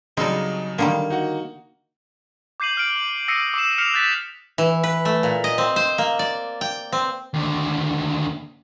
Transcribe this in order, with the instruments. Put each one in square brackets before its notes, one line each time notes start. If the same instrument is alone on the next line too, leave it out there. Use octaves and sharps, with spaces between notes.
[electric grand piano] C#3 F#3 D5 [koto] G3 C4 [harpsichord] D#4 A4
[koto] D3 D#3 G3 [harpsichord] A#3
[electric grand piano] D#4 F#4 F#5
[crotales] D6 G6 C7 D#7 F#7
F6 D7
D#6 E6 A#6 C7 C#7 D#7
D6 C7 E7
F6 C7 C#7 D#7 F7
F#6 G6 A6 B6 C7
[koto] E3
B4
A3
A#2
D#5
C4
C5
A#3
D5
G5
C4
[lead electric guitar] D#2 D3